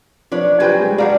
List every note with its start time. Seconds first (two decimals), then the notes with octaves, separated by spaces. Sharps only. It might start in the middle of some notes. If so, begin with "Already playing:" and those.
0.32 F3 D4 B4 C#5
0.60 F#3 G4 B4 C5 G5 G#5
0.79 G3 G#3 G#4
0.98 G3 D4 F#4 D5 F5 A#5